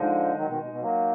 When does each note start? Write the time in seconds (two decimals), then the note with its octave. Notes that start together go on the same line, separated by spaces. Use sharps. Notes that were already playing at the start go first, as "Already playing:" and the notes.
Already playing: D3 F3 G#3 D#4
0.36 D#3 F#3
0.48 B2 D#3
0.60 B2
0.71 B2
0.81 F#3 A#3